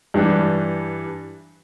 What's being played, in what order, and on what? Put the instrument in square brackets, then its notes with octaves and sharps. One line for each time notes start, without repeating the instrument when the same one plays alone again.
[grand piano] G2 E3 G3 D4